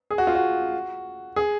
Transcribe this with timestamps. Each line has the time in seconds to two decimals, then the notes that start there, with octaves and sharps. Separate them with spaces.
0.11 G#4
0.18 F#4
0.27 F4
0.35 F#4
1.36 G#4